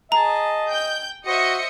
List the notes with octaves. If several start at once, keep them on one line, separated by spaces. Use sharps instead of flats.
G#4 D#5 A5 A#5
G5 G6
F#4 C5 D#5 E5 C#7